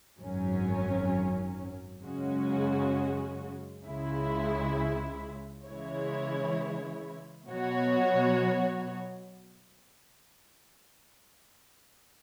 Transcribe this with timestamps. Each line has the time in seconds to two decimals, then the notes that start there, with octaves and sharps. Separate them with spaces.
0.20 G#1 F#2 F#3 C#4
2.02 F#2 C#3 G#3 C#4 F#4
3.84 C#2 C#3 G#3 E4
5.65 C#3 E3 G#3 E4 C#5
7.47 B2 F#3 B3 F#4 C#5